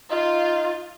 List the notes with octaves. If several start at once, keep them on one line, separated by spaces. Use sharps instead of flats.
D#4 F4